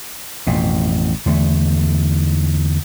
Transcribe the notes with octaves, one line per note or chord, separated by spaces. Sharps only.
A1 F2 B2
E2 D3 F#3 A3